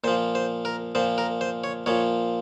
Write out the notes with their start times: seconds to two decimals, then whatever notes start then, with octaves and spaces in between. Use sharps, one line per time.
0.04 A#2 F3 C5
0.35 C5
0.65 A#4
0.95 A#2 F3 C5
1.18 A#4
1.41 C5
1.64 C#5
1.86 A#2 F3 C#5